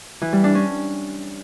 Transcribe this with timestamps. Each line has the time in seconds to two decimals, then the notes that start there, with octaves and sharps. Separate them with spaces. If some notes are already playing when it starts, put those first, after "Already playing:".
0.22 E3
0.33 G3
0.44 D4
0.55 C#4